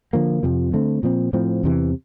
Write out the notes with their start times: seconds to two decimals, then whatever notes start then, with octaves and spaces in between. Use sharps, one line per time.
0.13 D3 F3 A#3
0.43 F2 C3 F3
0.73 D3 A3 C4
1.03 A#2 F3 C4
1.33 A2 F3 C4
1.63 E2 C3 E3